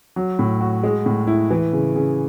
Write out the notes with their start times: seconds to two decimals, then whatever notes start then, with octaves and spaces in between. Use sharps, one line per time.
0.16 F#3
0.39 A2
0.61 F#4
0.83 G#3
1.06 A2
1.27 E4
1.51 E3
1.73 C#3
1.95 C#3